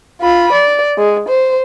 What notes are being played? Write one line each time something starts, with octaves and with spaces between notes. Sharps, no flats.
F4 B5
D5
G#3
C5